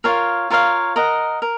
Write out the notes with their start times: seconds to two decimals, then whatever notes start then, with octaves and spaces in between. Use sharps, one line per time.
0.04 F4 A#4 C#5 F5
0.50 F4 A#4 C#5 F5
0.96 A#4 D#5 F#5
1.42 A#4